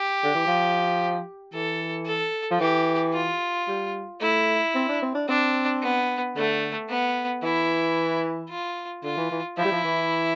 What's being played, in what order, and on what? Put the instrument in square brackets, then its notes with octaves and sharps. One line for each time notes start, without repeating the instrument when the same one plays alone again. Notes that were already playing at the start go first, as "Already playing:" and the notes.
Already playing: [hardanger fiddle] G4
[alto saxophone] D3
E3
F3
[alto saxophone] E3 [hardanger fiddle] A4
[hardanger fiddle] A4
[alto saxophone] F3
[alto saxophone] E3 [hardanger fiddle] G4
[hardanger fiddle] F4
[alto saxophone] G3
[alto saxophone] A3 [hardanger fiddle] E4
[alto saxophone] C4
D4
C4
D4
[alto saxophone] C4 [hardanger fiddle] D4
[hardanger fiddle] B3
[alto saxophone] D3 [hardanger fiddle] A3
[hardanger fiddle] B3
[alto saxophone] E3 [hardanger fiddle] E4
[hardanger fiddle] F4
[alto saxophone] D3 [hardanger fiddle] F4
[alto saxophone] E3
E3
[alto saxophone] F3 [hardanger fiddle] E4
[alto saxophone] G3
F3
E3